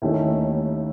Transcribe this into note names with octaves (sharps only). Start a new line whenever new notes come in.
D#2 D#3 A3 C#4 E4